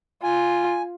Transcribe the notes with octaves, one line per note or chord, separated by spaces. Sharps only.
F4 G#5